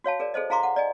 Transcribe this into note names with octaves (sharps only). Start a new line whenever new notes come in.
F#4 C#5 F5 A5
G#4 A#4 D5
G#4 A4 C5 D#5
E4 G#4 F5 A#5 C6 D6
F#5
D5 D#5 G#5